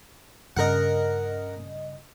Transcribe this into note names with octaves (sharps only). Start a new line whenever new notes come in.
G2 C#3 A#4 D#5 F#5